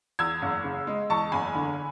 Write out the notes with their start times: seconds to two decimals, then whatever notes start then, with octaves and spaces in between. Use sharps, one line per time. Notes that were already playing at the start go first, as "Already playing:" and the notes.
0.19 E2 E6 G#6
0.42 F#1
0.64 C#3
0.87 G#3
1.10 E2 A5 C#6
1.32 F#1 G#5 B5
1.55 D3